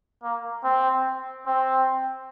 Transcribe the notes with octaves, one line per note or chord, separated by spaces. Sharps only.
A#3
C4
C4